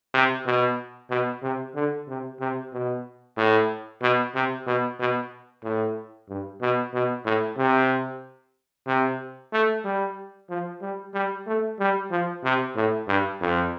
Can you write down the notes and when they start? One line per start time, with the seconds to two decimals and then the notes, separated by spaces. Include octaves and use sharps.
0.14 C3
0.46 B2
1.10 B2
1.42 C3
1.75 D3
2.08 C3
2.40 C3
2.73 B2
3.37 A2
4.02 B2
4.35 C3
4.67 B2
5.00 B2
5.64 A2
6.29 G2
6.62 B2
6.94 B2
7.25 A2
7.58 C3
8.87 C3
9.53 A3
9.85 G3
10.50 F3
10.82 G3
11.14 G3
11.47 A3
11.79 G3
12.11 F3
12.44 C3
12.75 A2
13.08 G2
13.41 F2